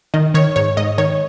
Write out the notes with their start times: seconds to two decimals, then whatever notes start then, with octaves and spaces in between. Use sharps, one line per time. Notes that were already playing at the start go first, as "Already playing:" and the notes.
0.14 D#3 D#5
0.34 D#3 C#5
0.56 G#2 C#5
0.77 G#2 D#5
0.98 D#3 C#5